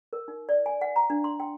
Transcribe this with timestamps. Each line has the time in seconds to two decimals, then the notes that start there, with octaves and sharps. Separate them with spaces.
0.13 A#4
0.28 D#4
0.49 D5
0.66 G#5
0.81 F#5
0.96 A#5
1.10 D4
1.24 C6
1.40 G5